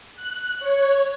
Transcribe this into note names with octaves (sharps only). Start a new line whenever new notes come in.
F#6
C#5